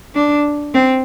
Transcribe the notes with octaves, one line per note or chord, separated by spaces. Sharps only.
D4
C4